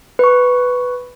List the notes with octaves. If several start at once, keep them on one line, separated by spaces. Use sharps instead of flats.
B4 C#6